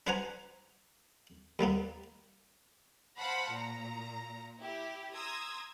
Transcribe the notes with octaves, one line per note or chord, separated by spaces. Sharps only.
D4 B4 C5 F#5 G#5 A#5
D#2 G3 A#3 B3
C5 F5 F#5 A5 B5 C6
A#2 A#5
E4 G4
A#5 C6 D#6 E6 G#6